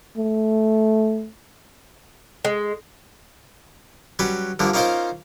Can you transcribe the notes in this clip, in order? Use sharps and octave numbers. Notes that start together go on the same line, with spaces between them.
A3
G#3
F#3 G3 C#4 B4
G2 D3 F3 A#3
A#3 C#4 D#4 F4 A#4 C5